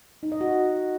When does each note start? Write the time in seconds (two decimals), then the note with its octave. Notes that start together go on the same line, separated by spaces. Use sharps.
0.23 D#4
0.32 D#5
0.41 F#4